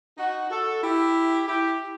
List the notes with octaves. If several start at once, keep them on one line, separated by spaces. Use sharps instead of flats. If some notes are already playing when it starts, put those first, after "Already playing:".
D#4 F#4
F#4 A4
E4 G4
E4 G4